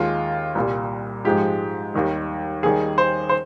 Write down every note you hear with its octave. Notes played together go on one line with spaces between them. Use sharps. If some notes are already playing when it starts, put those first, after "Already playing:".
Already playing: D#2 D#3 G#3 F4
C2 A#2 G3
G#2 F3 G#3 G4
D#2 D#3 G3
D#2 D#3 G3 G#4
C5
C5